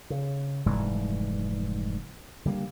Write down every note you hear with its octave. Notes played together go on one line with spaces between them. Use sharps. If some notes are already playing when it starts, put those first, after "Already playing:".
C#3
F1 G#2 E3 G3
D3 G3 A#3